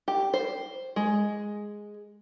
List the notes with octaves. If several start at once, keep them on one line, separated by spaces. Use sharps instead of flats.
G4
C5
G#3